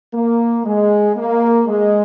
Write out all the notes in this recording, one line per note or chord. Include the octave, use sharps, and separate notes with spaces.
A#3
G#3
A#3
G#3